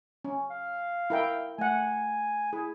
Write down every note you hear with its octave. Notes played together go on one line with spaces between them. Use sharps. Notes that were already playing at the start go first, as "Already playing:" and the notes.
C#4
F5
E4 A#4 G5
A3 F#5 G#5
E4 G#4